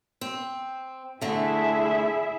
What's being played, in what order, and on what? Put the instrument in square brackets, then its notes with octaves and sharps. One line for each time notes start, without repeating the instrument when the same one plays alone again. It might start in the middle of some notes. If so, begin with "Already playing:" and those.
[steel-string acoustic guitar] C4
[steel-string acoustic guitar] D3 A3 [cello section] E4 G#4 E5